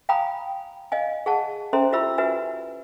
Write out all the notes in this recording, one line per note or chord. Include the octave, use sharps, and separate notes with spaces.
F5 G5 G#5 A#5 B5 D#6
D#5 F5 G#5
G#4 F#5 A5
C#4 A4 C5 E5 A#5 C6
E4 F4 G4 E5 B5 E6
F#4 B4 E5 G#5